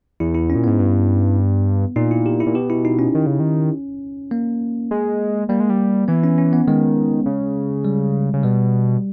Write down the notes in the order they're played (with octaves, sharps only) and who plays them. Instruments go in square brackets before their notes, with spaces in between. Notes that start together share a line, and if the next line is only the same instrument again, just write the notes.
[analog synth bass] E2 [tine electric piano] E4
[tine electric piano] E4
C#4
[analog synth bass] A#2
[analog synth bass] G#2 [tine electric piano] B3
[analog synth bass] G2
[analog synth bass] A#2 [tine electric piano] D#4
[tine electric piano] E4
G4
E4
[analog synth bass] A#2
[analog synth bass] B2 [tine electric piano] G4
[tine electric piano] E4
D#4
C#4
[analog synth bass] D#3
C#3
D#3
[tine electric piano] A#3
[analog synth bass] G#3
[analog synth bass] G3 [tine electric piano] A#3
[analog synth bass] G#3
G3
[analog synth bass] E3 [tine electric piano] B3
[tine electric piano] C#4
C#4
B3
[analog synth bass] D#3 [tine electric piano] G#3
[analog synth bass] C#3
[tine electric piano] G3
[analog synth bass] C#3
[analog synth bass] B2 [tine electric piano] G3